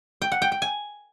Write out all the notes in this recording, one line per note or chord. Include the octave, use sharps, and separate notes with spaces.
G5
F#5
G5
G5
G#5